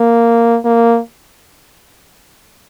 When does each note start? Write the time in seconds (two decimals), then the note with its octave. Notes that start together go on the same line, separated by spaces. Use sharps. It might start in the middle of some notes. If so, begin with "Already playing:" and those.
Already playing: A#3
0.65 A#3